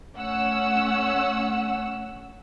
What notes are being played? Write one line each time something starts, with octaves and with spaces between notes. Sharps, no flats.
A3 C#4 F#5 E6